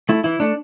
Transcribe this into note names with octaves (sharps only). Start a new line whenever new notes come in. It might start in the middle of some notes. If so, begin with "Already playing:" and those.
A3 E4
E3 E4
A3 D4